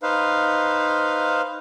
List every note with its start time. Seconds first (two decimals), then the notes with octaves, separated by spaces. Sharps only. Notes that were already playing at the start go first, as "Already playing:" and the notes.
0.03 D#4 B4 C5 F5